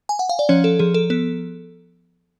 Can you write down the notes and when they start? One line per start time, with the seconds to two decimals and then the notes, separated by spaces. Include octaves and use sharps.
0.09 G#5
0.19 F#5
0.29 F5
0.39 D5
0.49 F3 C#4 C#5
0.64 A4
0.79 F3 G#4
0.94 A4
1.10 B3 A4